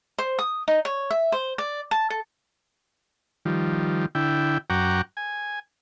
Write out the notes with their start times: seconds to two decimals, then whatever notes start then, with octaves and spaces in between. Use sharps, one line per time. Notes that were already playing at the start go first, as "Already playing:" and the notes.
0.18 C5
0.39 D#6
0.68 D#4
0.85 C#5
1.11 E5
1.32 C5
1.58 D5
1.91 A5
2.10 A4
3.45 D#3 F3 G3
4.15 D3 E4 G5
4.70 F#2 F#5 G5 A#5 C#6 D6
5.17 G#5